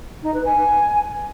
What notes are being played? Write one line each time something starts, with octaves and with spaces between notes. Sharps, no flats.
D#4
B4
G#5